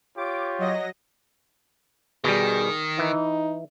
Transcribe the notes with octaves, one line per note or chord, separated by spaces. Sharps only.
F4 G4 C#5 D6
F#3 D#5 A#6
B2 D#3 G3 G#4
E3 D#4